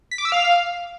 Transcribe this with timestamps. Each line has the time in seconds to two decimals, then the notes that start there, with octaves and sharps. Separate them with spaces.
0.11 B6
0.18 D6
0.25 E6
0.32 F5